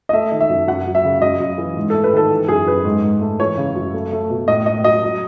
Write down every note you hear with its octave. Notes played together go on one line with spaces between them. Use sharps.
D#5
A3 E5
D#3
E5
F#2
F#2 F#5
F#3
E5
C#3
F#2 D#5
F#2
E3
G#2
A4
A3
B4
D#3 A4
E3
F#2 G#4
F#2 B4
G#2
G#2
A3
E3 C#5
C#3
F#2
A3
A3
B2
A2 D#5
A2 D#5
F#3 D#5
F#3